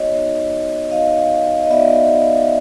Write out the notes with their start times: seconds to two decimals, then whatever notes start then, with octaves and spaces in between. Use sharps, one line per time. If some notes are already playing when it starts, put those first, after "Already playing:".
Already playing: B3 D#4 F#4 C#5 D#5
0.11 B3 D#4 F#4
0.91 B3 D#4 F#4 D#5 F5
1.63 D#5
1.70 B3 D#4 F#4 D5 E5